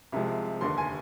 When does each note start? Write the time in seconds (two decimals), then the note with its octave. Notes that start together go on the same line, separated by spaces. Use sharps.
0.12 C2 C3 F3 G#3
0.61 F1 D#2 D3 C6
0.78 G#5